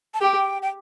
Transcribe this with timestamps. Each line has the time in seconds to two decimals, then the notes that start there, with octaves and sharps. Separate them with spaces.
0.14 A5
0.21 G4 G5
0.62 G5